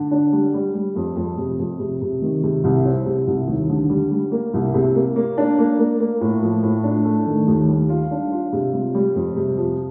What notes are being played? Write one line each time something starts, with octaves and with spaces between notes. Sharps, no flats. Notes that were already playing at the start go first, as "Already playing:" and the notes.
Already playing: D3
D4
G3
G3
G3
F2
F2
C3
F2
C3
C3
D#3
C3
C2
C4
C3
C2
D#2
D3
G3
G3
A#3
C2
C3
A#3
A#3
D4
A#3
A#3
A#3
A2
F3
A2
D4
A3
D#3
D#2
G3
F4
D4
F4
C3
G3
G3
F2
C3
F3